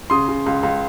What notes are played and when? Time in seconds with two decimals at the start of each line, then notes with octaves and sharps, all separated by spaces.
0.10 C#3 C6 D#6
0.28 C#3
0.46 C#2
0.63 C#2